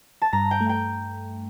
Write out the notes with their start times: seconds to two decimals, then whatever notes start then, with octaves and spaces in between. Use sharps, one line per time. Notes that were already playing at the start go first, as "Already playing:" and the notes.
0.22 A5
0.33 G2 A#5
0.51 G5
0.61 A3
0.69 G5